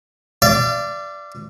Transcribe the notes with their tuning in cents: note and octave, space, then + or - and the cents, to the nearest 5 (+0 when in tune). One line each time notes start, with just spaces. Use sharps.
D5 +0 F5 -45